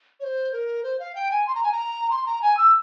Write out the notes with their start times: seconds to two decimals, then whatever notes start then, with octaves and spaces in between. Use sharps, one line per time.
0.20 C#5
0.24 C5
0.52 A#4
0.83 C5
0.99 F5
1.15 G5
1.31 G#5
1.47 C6
1.55 A#5
1.63 G#5
1.72 A#5
2.10 C6
2.26 A#5
2.42 G#5
2.57 E6